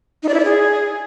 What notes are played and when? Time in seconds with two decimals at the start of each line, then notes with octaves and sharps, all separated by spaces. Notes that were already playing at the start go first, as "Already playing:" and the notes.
0.23 D#4
0.29 D5
0.34 E4
0.39 D5
0.45 G#4